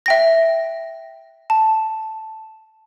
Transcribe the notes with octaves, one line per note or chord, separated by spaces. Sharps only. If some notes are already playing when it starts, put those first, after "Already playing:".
E5 G5 A#6
A5